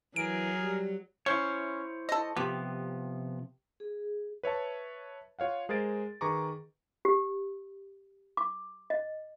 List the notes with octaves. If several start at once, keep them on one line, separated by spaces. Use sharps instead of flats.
E3 F#3 G#4 A#4 D7
G3
C#4 E4 C5 C#5
A4 D#5
C3 F3 B3 G4
G#4
B4 C#5 E5 A5
F4 C#5 F5 F#5
G#3 G#4 A#4 C5 A6 D7
D#3 G#4 B4 A#5 C#6 D6
G4
D6
D#5